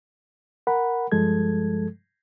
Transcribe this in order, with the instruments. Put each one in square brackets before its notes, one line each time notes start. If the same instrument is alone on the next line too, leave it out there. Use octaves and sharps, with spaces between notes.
[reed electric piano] A#4 F#5 B5
G2 F3 G#3 A4 G#6